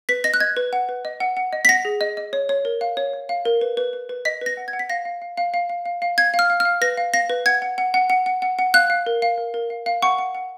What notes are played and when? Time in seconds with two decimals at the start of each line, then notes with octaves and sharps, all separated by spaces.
0.09 B4 B6
0.24 D#5 A#6
0.34 F#6
0.40 D#5 G#6
0.56 B4
0.73 F#5
0.89 B4
1.05 D#5
1.20 F#5
1.37 F#5
1.53 D#5
1.65 B6
1.69 F#5 A#6
1.85 G#4
2.01 D#5
2.17 D#5
2.33 C#5
2.49 C#5
2.65 A#4
2.81 F5
2.97 C#5
3.13 C#5
3.29 F5
3.45 A#4
3.61 B4
3.77 B4
3.93 B4
4.09 B4
4.25 D#5 B6
4.41 B4 A#6
4.57 F#5
4.68 G#6
4.73 F#5
4.79 B6
4.90 F5 A#6
5.05 F5
5.22 F5
5.37 F5
5.54 F5
5.70 F5
5.86 F5
6.02 F5
6.18 F5 G#6
6.34 F5
6.39 F6
6.50 F5
6.60 F6
6.65 F5
6.81 B4 A#6
6.97 F5
7.14 F5 A#6
7.29 B4
7.46 F#5 G#6
7.62 F#5
7.78 F#5
7.94 F#5
8.10 F#5
8.26 F#5
8.42 F#5
8.59 F#5
8.74 F5 F#6
8.90 F5
9.06 A#4
9.22 F5
9.38 A#4
9.54 A#4
9.70 F5
9.86 F5
10.02 F#5 C#6
10.18 F#5
10.35 F#5